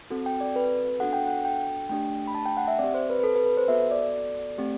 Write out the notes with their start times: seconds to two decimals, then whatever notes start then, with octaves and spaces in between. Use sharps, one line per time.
0.10 C4 F#4 A4
0.26 G5
0.41 D5
0.56 B4
1.00 B3 D4 F#4 A4 F#5
1.13 G5
1.27 F#5
1.45 G5
1.89 A3 D4 G4 G5
2.27 B5
2.35 A5
2.45 G5
2.57 F#5
2.68 E5
2.79 C4 G4 D5
2.94 C5
3.10 B4
3.20 B4
3.23 A4
3.36 B4
3.46 B4
3.57 C5
3.68 B3 F#4 A4 E5
3.91 D5
4.58 A3 C4 G4